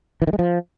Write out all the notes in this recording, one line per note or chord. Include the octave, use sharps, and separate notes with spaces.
E3
D#3
G#3
F3